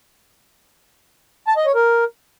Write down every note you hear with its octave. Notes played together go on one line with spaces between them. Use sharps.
A5
D#5
C#5
A#4